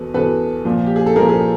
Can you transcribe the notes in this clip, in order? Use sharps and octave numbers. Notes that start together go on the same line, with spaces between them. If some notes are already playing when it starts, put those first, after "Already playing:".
Already playing: E2 B2 A4 B4
E2 B2 A4 B4
A#2 F3
G4
G#4
A4
A#2 F3 G#4 A#4
G#4 A#4